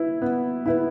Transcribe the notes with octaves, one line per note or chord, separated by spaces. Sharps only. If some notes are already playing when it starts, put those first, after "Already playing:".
Already playing: E4 B4
B3
E4 B4